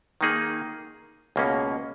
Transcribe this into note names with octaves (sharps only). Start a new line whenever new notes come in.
D#3 A#3 D#4 G#4
C#2 B2 A#3 C#4